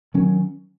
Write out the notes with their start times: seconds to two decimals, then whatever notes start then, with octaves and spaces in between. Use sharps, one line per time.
0.14 D#3 F#3 C#4